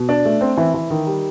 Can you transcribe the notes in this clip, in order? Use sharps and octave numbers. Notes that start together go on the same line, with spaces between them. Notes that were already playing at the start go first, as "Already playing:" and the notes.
Already playing: B2
D4
A3
C4
E3
E3
D#3
G3